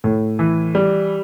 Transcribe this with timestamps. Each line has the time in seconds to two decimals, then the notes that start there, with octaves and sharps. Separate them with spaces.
0.04 A2
0.39 E3
0.75 G3